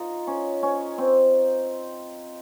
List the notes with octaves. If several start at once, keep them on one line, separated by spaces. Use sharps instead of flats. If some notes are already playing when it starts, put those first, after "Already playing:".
Already playing: D#4 F4
C#4
C#4
C4